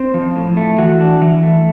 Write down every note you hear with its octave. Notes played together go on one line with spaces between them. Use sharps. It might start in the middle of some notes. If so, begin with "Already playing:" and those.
Already playing: C4 C5
F3
A2
A3
E3 F#4
D4
E3
A3